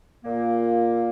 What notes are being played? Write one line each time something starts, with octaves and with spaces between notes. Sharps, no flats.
A#2 A#3